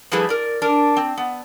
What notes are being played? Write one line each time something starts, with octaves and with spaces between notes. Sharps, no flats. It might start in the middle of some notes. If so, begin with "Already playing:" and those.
F3 G3 A3 E4 G#4 B4
A#4 D5
D4 A#4
C4
B3